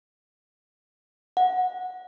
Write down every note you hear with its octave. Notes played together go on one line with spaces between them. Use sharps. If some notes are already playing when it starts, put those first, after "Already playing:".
F#5